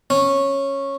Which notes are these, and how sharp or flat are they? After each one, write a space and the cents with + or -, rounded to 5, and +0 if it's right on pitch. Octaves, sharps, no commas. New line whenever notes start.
C#4 -10